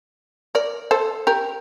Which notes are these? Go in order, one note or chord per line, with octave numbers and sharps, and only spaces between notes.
A#4 D5
A4 C5
G4 A#4